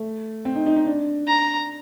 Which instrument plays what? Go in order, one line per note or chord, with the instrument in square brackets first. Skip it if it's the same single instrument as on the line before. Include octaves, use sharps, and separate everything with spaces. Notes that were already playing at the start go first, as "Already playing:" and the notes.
Already playing: [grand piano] A3
C4
D#4
D#4
D#4
D4
[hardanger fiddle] A#5